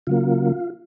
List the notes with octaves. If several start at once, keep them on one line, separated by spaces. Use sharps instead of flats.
C#3 F#3 A#3 F4